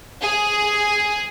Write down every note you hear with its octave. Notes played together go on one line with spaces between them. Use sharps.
G#4